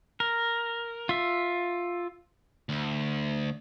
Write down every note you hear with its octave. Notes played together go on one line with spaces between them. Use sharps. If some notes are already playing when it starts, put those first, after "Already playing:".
A#4
F4 E5
D2